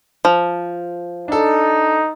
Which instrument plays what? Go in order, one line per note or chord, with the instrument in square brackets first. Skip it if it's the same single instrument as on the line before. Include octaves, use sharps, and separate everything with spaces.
[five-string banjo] F3
[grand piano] D4 A4 [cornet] D#4